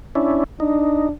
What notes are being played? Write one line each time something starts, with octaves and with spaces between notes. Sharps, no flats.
C#4 D4 E4
D4 D#4